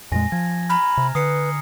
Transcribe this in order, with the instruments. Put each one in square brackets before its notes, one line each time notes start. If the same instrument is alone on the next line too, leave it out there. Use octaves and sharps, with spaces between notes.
[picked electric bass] F2 A#2 G#3 [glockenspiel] G#5 A#6
[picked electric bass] F3 [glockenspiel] G#6
[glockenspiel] A#5 F6 [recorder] B5
[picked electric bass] C3
[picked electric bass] D3 [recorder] B4 [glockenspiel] D#6 C7 C#7